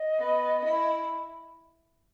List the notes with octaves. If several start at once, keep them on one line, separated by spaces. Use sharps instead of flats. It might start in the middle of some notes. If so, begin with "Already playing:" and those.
Already playing: D#5
B3
E4